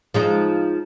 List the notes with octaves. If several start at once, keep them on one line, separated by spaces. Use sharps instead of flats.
F3 G#3 D#4